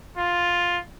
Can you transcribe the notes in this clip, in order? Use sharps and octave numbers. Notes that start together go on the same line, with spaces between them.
F4